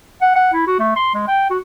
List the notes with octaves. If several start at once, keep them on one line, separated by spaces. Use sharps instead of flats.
F#5
F#5
E4
F#4
A3
C6
G#3
G5
F#4